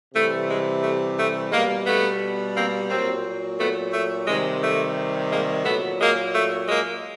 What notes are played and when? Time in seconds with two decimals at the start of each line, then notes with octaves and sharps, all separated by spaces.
0.14 C3 E3 G3 A3
0.48 G#3
0.83 A3
1.18 A3
1.52 B2 G3 G#3 A#3
1.86 A3 B3
2.55 A#3 C4
2.90 A#2 F#3 A#3 C4
3.60 A3 B3
3.93 A3
4.28 C3 D#3 G3 G#3
4.62 A3
5.31 G#3 A#3
5.65 A#2 F#3 A3 B3
6.01 G#3 A#3
6.35 A3
6.69 G#3 A#3